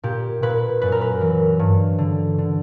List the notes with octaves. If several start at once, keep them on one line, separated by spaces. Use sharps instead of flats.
A#2 G4
A#2 B4
F#2 B4
A#4
B4
E3
G2
D3
D3